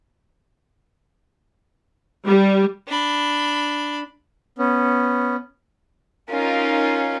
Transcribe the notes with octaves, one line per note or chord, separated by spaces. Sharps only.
G3
D4 B5
B3 C#4
C#4 D#4 F4 A#4